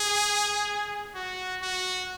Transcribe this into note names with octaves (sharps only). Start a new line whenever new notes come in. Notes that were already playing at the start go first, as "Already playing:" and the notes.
Already playing: G#4
F#4
F#4